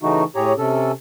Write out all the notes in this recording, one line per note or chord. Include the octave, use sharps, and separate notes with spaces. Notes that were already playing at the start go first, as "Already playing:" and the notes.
C#3 E3 A3 D#4 F#4
A2 G4 G#4 C#5 A#5
C3 C#4 A4